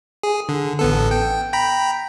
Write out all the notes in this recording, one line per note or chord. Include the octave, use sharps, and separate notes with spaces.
G#4
D3
A1 B3 A4
G5
G5 A#5 B5